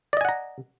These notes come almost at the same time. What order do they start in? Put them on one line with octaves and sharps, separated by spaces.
D5 D#5 G#5 F#5 A#5